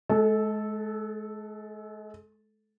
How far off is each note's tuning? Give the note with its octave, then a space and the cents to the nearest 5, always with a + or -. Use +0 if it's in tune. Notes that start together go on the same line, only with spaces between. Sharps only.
G#3 +35 A4 -10